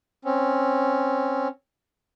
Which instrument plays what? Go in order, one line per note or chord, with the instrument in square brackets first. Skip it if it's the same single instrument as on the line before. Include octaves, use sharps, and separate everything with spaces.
[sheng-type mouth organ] C4 C#4